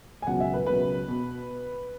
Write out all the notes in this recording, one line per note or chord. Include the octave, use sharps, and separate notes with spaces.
G#5
C#2 B2 F#3 F#5
E5
B4
C#2 B2 F#3 B4
B2